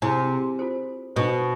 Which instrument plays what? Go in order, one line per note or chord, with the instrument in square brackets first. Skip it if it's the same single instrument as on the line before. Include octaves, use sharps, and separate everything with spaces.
[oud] C3 [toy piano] E4 G#4 C5 G#5
[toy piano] F4 A4 C5
[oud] B2 [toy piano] D4 A4 C5